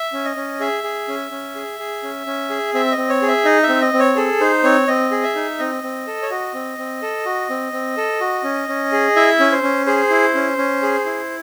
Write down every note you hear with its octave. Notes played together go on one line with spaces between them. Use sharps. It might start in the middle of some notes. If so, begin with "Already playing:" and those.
Already playing: E5
C#4
D#5
C#4
G#4 E5
G#4
C#4
C#4
G#4
G#4
C#4
C#4
G#4
C4 E5
D#5
C4
C#5
G#4
E5
D#4 D#5
E5
C4
D#5
C4
C#5
G#4 A4
D#4 C5
C4 C#5
C4 D#5
G#4
E5
D#4
C4 D#5
C4
A4
C#5
F#4 D#5
C4
C4
A4
F#4
C4
C4
A4
F#4
C#4
C#4
G#4
E4 E5
C#4
C5
C#4
G#4 C5
E4
C#4
C#4
G#4
E4